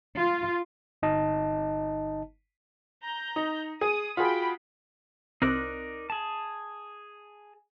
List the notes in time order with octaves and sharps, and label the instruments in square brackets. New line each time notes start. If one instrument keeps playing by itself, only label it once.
[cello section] F4
[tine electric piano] G1 D#4 D#5 A5
[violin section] A#5 G6
[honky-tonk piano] D#4
[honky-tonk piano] G#4 [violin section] D#6
[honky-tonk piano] F4 F#4 G#4 [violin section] G5 B5
[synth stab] C2 C4 F#6 [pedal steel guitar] D#4 A#4 D5
[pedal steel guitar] G#4 A5